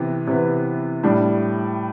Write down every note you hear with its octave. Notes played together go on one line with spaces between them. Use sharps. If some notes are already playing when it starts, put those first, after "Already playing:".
Already playing: C3 E3 B3
C3 E3 B3
A2 G3 D4